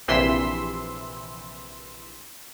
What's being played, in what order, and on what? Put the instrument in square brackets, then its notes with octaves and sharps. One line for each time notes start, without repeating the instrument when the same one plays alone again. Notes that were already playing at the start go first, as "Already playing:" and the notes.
[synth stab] A#1 C3 E3 C6 E6 B6